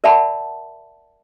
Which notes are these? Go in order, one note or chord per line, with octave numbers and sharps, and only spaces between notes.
A#4 D5 E5 F#5 A5 B5